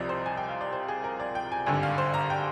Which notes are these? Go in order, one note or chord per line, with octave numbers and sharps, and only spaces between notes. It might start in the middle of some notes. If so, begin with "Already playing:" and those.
Already playing: C2 C3 F3 D5 D#5
C5
G#5
G5
F5
D5
C5
G#4
A#4
D5
G5
G#5
G#1 G2 D3 G#5
F5
C5
A#5
G5